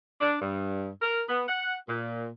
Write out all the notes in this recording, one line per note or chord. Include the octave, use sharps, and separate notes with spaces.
D4
G2
A#4
B3
F#5
A#2